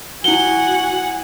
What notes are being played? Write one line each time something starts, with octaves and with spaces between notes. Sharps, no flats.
E4 F#4 F#5 G#5 G7